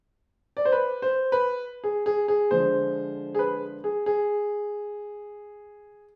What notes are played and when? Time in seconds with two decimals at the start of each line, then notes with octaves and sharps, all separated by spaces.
0.57 D5
0.65 C5
0.72 B4
1.02 C5
1.32 B4
1.84 G#4
2.06 G#4
2.28 G#4
2.50 D3 F3 G#3 C5
3.35 G#4
3.39 B4
3.84 G#4
4.06 G#4